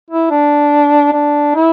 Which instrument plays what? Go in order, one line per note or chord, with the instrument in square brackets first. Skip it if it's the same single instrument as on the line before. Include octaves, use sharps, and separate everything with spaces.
[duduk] E4
D4
D4
E4